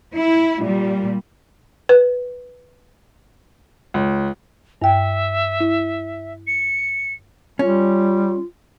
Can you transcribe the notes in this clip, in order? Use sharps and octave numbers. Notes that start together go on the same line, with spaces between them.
E4
A#2 G3
B4
C#2
G2 E5 G5
E4
C#7
G3 C#4 F4